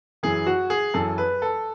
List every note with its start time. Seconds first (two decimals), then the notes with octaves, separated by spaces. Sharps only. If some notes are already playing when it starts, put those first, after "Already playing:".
0.23 F#2 E3 G#4
0.46 F#4
0.70 G#4
0.94 F#2 E3 A4
1.18 B4
1.42 A4